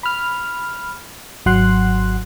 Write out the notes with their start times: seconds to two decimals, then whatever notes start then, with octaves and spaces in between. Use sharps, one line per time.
0.03 B5 F6
1.46 G#1 F#3 F#5 C6 F#6